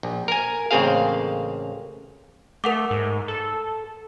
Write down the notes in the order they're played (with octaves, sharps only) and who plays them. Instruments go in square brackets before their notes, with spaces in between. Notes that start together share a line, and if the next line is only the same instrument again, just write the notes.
[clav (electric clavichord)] A#1
A#4 G#5
A1 C#3 A#3 C4 G#4 F5
[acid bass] A3 [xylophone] A#4 F#5 D6
[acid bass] G#2
A4